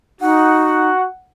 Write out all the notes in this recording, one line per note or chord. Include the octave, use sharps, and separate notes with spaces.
D#4 F#4 F#5